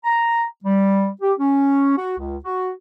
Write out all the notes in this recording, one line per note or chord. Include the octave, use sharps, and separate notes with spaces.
A#5
G3
G4
C#4
F#4
C#2
F#4